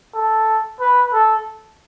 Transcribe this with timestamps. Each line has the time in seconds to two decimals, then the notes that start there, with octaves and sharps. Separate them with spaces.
0.15 A4
0.80 B4
1.13 A4